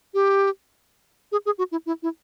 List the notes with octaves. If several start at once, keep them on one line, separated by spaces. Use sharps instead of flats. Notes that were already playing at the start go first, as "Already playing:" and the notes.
G4
G#4
G#4
F#4
E4
E4
E4